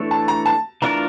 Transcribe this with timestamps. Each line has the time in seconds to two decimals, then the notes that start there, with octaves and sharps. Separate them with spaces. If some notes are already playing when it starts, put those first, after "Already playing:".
Already playing: E3 A3 D4 A4 C#5
0.11 A5
0.28 A#5
0.46 A5
0.82 E3 A3 D4 F4 A#4 A#5